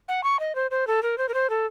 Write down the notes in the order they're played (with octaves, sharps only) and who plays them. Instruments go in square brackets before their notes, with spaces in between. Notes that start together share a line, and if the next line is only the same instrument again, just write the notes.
[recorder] F#5
C#6
D#5
C5
C5
A4
A#4
C5
A#4
C5
A4